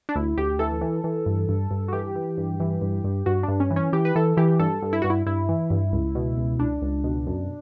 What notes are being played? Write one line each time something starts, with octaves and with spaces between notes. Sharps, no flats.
D4
D2 E4
D2 G4
E3 A4
E3
E3
G2
G2
G2
F#4
E3 G4
E3
G2
E3
G2
G2
G2 F#4
D4
G2
C#4
E3
C#4
E3 G4
B4
E3 A4
E3 G4
G2 A4
G2
E4
G2 F#4
E4
G2 E4
E3
G2
C#2
B2
C#2
C#2 D4
C#2
B2
F#2